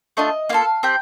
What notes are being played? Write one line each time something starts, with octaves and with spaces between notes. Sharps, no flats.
A3 D4 F4 D#5
A#3 F4 A4 F5
C4 G4 G5